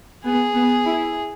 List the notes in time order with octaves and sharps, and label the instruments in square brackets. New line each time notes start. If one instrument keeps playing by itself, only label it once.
[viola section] B3 [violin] G#4
[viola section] B3
E4